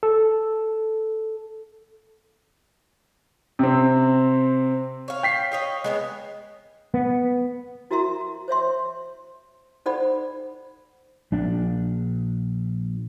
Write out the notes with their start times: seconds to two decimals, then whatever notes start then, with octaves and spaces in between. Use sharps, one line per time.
0.03 A4
3.59 C3 C4
5.08 C#5 F5
5.23 G5 B6 C7
5.52 C#5 D#5 F5
5.84 G#3 B3 C#5
6.94 B3
7.91 E4 F#4 A#4 E5 A#5 C6
8.48 C5 C#5 E5 C6
9.86 D#4 A4 C5 D5 F#5 B5
11.32 A#1 D4